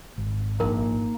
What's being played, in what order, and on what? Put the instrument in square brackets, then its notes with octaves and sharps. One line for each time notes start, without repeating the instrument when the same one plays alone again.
[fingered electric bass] G#1
[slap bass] A#1 [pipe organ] A#3 D#4 [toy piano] A#4